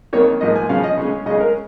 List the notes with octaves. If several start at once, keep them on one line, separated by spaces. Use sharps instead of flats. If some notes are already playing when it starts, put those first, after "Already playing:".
F2 D#3 A#3 C#5
G#2 F3 A#3 D#5
G#5
C#3 F3 C#4 F5
D#5
C#3 G#3 C#4
C#3 G#3 C#4 D#5
A#4